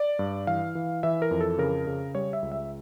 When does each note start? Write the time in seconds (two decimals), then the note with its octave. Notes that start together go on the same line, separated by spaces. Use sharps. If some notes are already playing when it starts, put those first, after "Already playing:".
Already playing: D5
0.19 G2
0.47 E3 F5
0.75 E3
1.03 E3 E5
1.22 A#4
1.31 F2
1.41 A4
1.58 C#3 A#4
1.87 C#3
2.15 G3 C#5
2.33 E5
2.42 C#2
2.52 E5